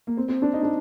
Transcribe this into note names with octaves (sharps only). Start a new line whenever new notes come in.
A#3
C4
C4
D4
D#4
D4